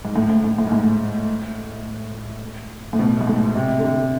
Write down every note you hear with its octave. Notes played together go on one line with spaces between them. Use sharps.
G#2
A2
A2
A2
A2
G#2
A2
A2
B2
G#2
A2
C3
D3
C3